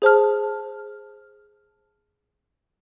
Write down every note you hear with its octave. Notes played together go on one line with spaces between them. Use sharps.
G#4 C5 A5 F6